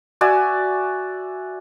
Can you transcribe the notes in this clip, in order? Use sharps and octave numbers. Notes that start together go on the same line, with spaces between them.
F#4 D5 E5 G#5